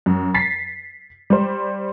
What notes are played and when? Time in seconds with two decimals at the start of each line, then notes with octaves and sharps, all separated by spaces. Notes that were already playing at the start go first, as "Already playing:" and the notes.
0.06 F#2
0.34 A6 B6 C7
1.30 G3 C5